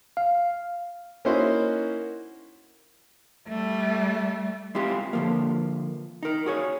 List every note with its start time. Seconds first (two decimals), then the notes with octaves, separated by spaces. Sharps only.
0.17 F5
1.25 A#3 C#4 D#4 E4 F#4 C5
3.48 G3 A3
4.75 G#3 C4 E4 F4 G4 G#4
5.13 D3 F3 A#3
6.23 D#4 A#4
6.46 F#4 G#4 C#5